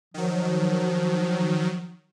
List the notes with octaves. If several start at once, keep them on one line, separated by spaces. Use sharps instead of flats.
D#3 F3 F#3